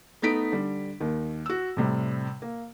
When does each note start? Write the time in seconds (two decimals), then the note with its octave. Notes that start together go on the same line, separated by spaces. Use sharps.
0.22 A3 B3 D#4 B6 D7
0.52 D3 G3
1.00 D#2 D#3
1.46 F#4 E6
1.77 A2 C3 G3
2.42 A#3